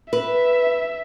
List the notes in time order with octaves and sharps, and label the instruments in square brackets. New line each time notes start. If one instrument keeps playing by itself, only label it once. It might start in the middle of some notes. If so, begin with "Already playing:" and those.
[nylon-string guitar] B4 [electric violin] E5